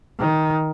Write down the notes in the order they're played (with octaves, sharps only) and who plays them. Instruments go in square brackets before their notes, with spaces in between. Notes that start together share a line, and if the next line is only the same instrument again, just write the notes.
[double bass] D#3